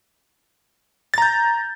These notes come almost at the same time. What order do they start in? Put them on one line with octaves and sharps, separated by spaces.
A6 A#5 G6